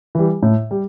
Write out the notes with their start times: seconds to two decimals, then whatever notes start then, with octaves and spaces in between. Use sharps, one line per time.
0.15 E3 G3
0.42 A2
0.71 G3